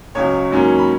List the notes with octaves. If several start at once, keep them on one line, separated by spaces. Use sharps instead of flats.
C#2 C#3 F#3 C#5 C#6
G#2 F#3 A#3 C#4
B5